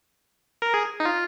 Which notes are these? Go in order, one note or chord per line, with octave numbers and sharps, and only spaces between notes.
A#4
G#4
D#4
F4